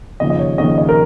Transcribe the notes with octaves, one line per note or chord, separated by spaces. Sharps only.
D#2 C#3 F3 D#5
D#5
C#5
D#2 C#3 F3 D#5
D#5
A#4